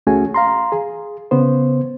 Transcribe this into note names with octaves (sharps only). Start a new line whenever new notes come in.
C#2 A3 C#4 F#4 G#4 G#5
F5 A#5 C6
G#4
C#3 B3 C5